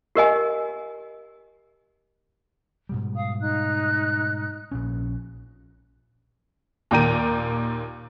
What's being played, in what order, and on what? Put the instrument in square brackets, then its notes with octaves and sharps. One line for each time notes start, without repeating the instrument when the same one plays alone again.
[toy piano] G4 A#4 D#5 G#5
[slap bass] G#2 B2 G3
[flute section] F5 D#6
D#4 F#6
[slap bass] A#1 A#2 C#4
[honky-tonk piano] D#2 A#2 D5 G5 A#5 D#7